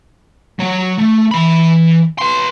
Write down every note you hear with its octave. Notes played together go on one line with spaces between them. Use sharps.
F#3 C#5
A3
E3 B5
B4 C6